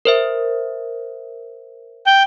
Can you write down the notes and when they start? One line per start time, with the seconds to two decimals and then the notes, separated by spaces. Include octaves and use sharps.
0.05 A#4 C5 E5
2.07 G5